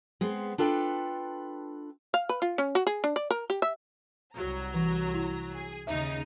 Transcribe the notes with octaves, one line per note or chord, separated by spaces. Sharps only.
G#3 B3 C4
D4 F4 A4 B4 G5
F5
B4
F4
C#4
F#4
G#4
D4
D5
A#4
G4
E5
C2 F#3 A#5
E3
E4
G#4
D#2 C#3 D#4 E5